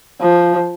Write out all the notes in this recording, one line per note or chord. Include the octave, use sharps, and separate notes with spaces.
F3